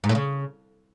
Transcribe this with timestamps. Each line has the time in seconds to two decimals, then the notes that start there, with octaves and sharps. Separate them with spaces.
0.04 G#2
0.09 A2
0.15 C#3